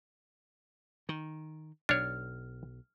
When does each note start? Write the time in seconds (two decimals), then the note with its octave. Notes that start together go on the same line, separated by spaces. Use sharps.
1.09 D#3
1.89 B1 D4 C#5 F6